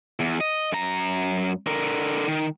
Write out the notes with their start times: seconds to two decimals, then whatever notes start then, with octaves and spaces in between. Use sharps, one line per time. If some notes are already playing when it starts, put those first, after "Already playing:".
0.20 E2
0.41 D#5
0.72 F#2 A#5
1.67 D3 A#4
2.28 D#3